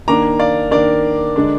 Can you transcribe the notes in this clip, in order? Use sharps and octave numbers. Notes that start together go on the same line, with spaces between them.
D#3 A#3 D4 A#5 D6
D5 F5
D#3 A#3 D4 A#4 D5
D3 G#3 D4